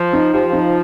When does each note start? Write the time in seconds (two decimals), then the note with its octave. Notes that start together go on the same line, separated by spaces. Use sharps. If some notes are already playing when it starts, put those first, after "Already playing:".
Already playing: F3
0.13 D#4
0.33 F3 G4
0.53 D#4